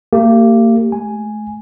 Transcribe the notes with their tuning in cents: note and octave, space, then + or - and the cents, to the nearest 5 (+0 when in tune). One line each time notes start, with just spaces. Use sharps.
A#3 -40 G4 +0
A3 -40 G#5 +0